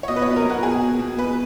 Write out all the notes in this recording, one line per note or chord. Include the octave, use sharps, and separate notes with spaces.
C#5
B2 D#5
B4
B2 C#5
A#4
B2 F#4
B2 G#4
B2
B2
B2 B4